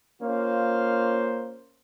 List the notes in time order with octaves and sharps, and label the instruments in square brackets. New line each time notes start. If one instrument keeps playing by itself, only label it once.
[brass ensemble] A#3 C#4 F4 C5 F5